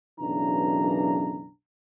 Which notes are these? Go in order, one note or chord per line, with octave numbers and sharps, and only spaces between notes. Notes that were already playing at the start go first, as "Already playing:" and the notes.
B1 F#2 C#3 E3 D4 A#5